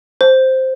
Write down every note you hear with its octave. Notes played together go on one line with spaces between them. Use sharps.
C5